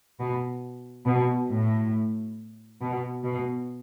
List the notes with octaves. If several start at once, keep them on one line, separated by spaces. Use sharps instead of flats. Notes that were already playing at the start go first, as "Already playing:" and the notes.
B2
B2
A2
B2
B2